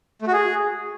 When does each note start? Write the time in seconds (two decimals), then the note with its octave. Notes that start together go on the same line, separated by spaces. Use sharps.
0.22 A3
0.28 F#4
0.33 G#4